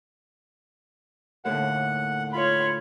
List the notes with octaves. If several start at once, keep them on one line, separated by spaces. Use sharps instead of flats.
D#2 A2 D3 F#5
F4 C#5 B5